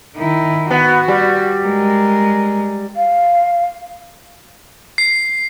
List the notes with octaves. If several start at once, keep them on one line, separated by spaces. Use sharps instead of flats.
D#3 E4
B3 F#4
G3
G#3 A#4
F5
C7